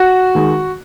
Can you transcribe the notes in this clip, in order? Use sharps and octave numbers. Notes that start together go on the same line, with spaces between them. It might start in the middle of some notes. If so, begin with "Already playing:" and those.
Already playing: F#4
D#3 G#3